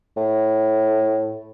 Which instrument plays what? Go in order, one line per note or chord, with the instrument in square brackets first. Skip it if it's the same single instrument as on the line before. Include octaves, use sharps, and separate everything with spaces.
[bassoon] A2